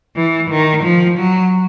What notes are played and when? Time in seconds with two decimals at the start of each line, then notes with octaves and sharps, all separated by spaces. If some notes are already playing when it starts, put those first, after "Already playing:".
0.16 E3
0.50 D#3
0.83 F3
1.18 F#3